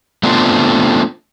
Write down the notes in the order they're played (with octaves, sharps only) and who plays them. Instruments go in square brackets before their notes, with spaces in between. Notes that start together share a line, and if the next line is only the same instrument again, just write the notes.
[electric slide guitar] A3 B3 C4 D4 F4